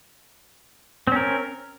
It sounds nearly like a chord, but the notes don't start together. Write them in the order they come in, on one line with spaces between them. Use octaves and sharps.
C4 C#4 A#4